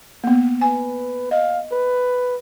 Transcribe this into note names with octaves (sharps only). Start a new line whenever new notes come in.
A#3 B3
B4 G#5
D#5 F5
B4